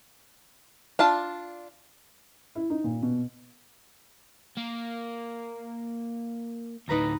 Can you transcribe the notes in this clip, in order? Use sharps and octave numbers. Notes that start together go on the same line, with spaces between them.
D4 F4 A5
E4
D#4
A#2
B2
A#3
D2 A2 D#4 B4 A#5